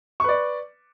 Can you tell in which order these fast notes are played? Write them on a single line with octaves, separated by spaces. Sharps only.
C#6 B4 D5